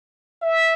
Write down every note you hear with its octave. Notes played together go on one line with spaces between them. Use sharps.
E5